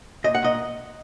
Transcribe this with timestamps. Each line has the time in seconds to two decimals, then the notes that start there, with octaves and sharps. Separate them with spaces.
0.24 A#2 D#5
0.34 F#5
0.43 A#2 D#5